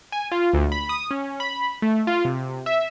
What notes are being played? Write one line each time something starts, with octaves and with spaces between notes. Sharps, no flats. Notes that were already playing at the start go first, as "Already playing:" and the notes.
G#5
F4
D2
B5
D#6
C#4
B5
A3
F4
C3
E5